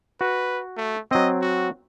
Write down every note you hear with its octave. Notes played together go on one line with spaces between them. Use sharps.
F#4 B4
A3
F#3 C4 D#5
F#4